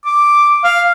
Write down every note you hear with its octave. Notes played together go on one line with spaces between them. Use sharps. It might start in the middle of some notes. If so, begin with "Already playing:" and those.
D6
F5